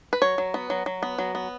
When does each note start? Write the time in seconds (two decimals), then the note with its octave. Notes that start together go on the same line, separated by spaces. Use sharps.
0.13 B4
0.22 F#3 C#5
0.38 F#3
0.54 B3
0.70 F#3
0.86 F#3
1.03 B3
1.18 F#3
1.35 B3